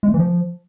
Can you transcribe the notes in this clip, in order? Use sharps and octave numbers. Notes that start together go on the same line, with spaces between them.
G#3
A3
E3
F3